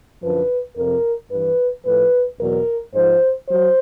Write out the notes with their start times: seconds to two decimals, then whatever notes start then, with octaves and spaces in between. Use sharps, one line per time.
0.22 F#2 D3 F3 B4
0.77 F2 C3 F3 A#4
1.31 G2 E3 B4
1.85 A2 F3 B4
2.40 E2 B2 F#3 A#4
2.94 G#2 F3 C5
3.49 F#3 C5